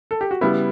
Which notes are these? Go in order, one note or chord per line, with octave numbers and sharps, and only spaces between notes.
A4
G4
F#4
C#3 G3 B3 E4